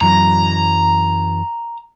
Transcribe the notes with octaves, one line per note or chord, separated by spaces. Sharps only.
F#2 E3 F#3 A#5